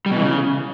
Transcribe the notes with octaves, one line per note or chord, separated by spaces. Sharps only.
G3
B2
E3
C#3